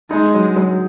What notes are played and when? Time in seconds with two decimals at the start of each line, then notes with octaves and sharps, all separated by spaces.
0.11 G#3 D#4
0.34 F#3
0.56 F#3